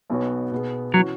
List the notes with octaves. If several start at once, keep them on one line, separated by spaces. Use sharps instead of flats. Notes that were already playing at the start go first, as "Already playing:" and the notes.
B1 B2 B3 F#4 C#5
B2 B3 G#4
E3 F#3 C#4 F#4